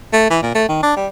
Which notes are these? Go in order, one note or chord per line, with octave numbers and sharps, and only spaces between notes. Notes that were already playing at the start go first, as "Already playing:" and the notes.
A3
E3
A#2
A3
D#3
D4
G3